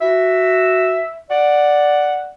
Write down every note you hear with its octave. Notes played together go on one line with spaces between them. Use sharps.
F#4 E5
D5 F#5